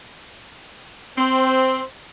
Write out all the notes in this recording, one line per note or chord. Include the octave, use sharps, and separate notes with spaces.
C4